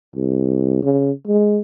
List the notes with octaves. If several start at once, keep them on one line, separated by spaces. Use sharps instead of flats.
C2
C#3
G#3